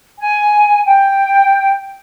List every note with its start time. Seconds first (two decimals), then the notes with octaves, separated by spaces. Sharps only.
0.19 G#5
0.86 G5